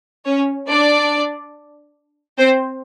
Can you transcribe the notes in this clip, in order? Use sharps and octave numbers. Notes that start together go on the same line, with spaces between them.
C#4 C#5
D4 D5
C4 C5